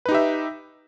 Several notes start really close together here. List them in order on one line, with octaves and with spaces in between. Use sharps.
B4 D#4 G4 E5